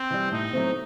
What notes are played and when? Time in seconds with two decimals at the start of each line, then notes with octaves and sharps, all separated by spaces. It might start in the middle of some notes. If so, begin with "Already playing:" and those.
Already playing: C4
0.11 E3 G3
0.32 A2 D#4
0.53 F#3 A3 C4